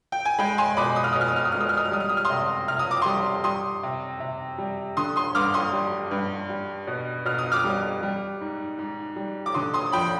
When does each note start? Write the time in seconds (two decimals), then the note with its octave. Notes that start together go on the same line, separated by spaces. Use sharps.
0.12 G5
0.25 G#5
0.39 G#3 G5 B5
0.58 G#5 C6
0.77 B2 B5 D6
0.96 D#6
1.04 F6
1.13 B2 D#6
1.21 F6
1.28 D#6
1.36 F6
1.45 D#6
1.52 G#3 F6
1.61 D#6
1.69 F6
1.77 D#6
1.85 F6
1.91 G3 D#6
2.00 F6
2.09 D#6
2.17 F6
2.25 C6 D#6
2.30 C3
2.68 C3 F6
2.79 D#6
2.91 D6
3.02 G3 C6 D#6
3.44 G3 C6 D#6
3.83 C3
4.20 C3
4.58 G3
4.97 D3 C6 D#6
5.16 C6 D#6
5.35 G2 D6 F6
5.54 C6 D#6
5.73 G3
6.11 G2
6.49 G3
6.87 B2
7.25 B2 F6
7.39 D#6
7.52 D6 F6
7.64 G3
8.03 G3
8.41 G#2
8.78 G#2
9.16 G3
9.46 D6
9.54 D3 C6 D#6
9.74 C6 D#6
9.92 F2 G5 B5